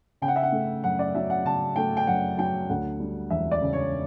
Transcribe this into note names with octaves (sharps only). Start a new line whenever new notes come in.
C#3 G5
F#5
E5
F#5
A3
F#2 F#5
D5
F#3 E5
F#5
C#3 A5
A3 G5
G5
F#2 F#5
F#3 G5
D2 F#5
G3
E1 E5
D5
C#3
C#5